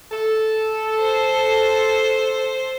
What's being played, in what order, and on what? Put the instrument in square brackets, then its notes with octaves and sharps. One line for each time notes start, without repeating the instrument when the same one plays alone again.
[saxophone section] A4
[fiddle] C5